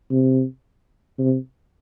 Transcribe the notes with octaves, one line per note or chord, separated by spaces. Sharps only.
C3
C3